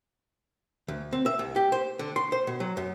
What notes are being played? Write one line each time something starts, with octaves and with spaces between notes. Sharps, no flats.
D2
C4
E5
C2
G4
C5
D3
C6
C5
B2
F#3
F#2